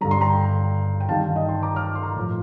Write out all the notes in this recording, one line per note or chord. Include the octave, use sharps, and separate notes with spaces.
G2 D3 G3 A#5
C6
G5 A#5
G5
G2 D#3 G3 F5 A5
D#5 G5
A5 C6
A#5 D6
D6 F6
C6
A#5 D6
A2 F3